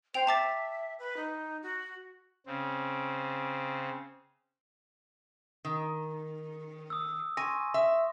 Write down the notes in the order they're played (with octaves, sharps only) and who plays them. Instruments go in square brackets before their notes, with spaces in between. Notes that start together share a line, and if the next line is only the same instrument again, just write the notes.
[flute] C5 [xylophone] G5 F7
[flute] E5 [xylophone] A5 D6 A6
[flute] B4
D#4
F#4
[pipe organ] C#3 C4
[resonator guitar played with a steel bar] D#3
[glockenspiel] D#6 E6
[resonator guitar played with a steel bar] G#5 [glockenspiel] C6 C#6 A#6
[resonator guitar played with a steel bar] E5